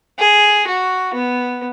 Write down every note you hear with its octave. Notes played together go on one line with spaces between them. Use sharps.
G#4
F#4
B3